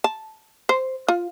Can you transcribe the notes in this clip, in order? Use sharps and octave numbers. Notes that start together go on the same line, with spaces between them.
A5
C5
F4